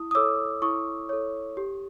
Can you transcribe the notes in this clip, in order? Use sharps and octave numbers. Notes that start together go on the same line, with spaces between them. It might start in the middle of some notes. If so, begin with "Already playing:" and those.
Already playing: E4 D#6
D#6
A4 C#5 D6 E6
E4 C#6 D#6
A4 C#5
G4